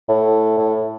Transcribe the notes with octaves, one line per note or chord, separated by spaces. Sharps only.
A2
A2